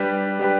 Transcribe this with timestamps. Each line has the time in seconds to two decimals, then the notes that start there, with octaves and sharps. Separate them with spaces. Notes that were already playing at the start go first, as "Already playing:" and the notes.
Already playing: G3 D4 G4 B4
0.39 G3 D4 G4 B4